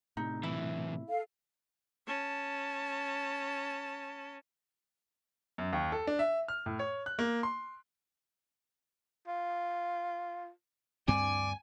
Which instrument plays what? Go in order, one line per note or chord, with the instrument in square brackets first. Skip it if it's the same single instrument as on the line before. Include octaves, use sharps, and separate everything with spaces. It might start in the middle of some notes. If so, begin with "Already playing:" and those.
[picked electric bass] A2 C3 [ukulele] D#4
[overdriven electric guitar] B1 E3 [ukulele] E4
[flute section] A4 F5
[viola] C#4 A5
[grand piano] F#2
D#2
A4
D4
E5
F6
A2
C#5
F#6
A#3
C6
[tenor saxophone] F4
[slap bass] D2 G2 C4 [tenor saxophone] D5 [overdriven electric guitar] G#5